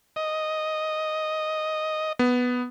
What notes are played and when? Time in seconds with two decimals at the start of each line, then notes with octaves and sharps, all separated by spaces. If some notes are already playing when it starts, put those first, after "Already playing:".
0.16 D#5
2.19 B3